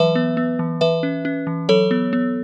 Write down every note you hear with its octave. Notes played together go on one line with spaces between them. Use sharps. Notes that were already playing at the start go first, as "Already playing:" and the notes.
Already playing: E3 F#3 B4 E5
B3
B3
E3
E3 B4 E5
C#4
C#4
E3
F#3 A4 C#5
B3
B3